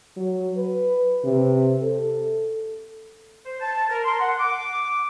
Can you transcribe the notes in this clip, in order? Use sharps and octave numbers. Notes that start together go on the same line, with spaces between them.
F#3
B4
C3
A4
C5
A5
A#4
C6
F#5
D6